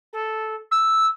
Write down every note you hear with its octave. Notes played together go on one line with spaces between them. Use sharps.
A4
E6